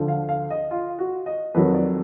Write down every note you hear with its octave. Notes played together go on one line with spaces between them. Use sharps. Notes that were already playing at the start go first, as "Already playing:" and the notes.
Already playing: D2 D3 F3
F5
F5
D#5
F4
F#4
D#5
F2 D#3 F#3 B4
D5